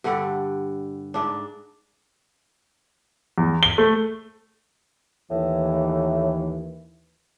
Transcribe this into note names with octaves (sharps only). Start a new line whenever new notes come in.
G2 D3 G3 F#5
G#2 D4
E2
G7
A3
D#2 A2 E3